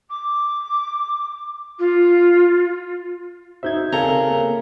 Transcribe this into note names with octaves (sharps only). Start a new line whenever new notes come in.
D6
F4
D#4 F#4 C5 E5 G6 G#6
C#3 C4 A4 A#4 A#5
A#3